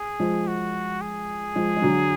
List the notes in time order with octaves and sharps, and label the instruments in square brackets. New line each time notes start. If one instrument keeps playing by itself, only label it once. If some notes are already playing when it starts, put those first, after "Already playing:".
Already playing: [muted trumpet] G#4
[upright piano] F3 G#3
[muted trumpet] F#4
G#4
[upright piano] F3 G#3
G#3
D3 F#3